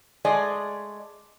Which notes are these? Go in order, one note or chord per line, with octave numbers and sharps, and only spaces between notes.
G#3 A3 G#4 D5 D#5